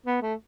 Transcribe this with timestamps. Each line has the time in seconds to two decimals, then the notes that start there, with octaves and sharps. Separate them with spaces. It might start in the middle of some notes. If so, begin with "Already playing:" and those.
0.06 B3
0.22 A3